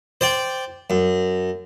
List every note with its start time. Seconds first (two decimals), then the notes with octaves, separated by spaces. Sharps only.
0.21 C5 D5 G5
0.90 F#2